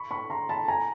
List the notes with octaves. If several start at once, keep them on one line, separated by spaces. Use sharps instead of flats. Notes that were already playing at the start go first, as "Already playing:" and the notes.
Already playing: B5 C#6
B5 C#6
A#5 C6
A5 B5
G#5 A#5